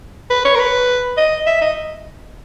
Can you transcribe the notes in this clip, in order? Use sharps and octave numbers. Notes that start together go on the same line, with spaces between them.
B4
C#5
A#4
B4
D#5
E5
D#5